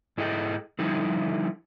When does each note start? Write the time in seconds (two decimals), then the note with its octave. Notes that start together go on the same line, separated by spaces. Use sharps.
0.18 G#2 E4 G#4 A4 D#5 G5
0.79 D3 F3 G3 D#4 E4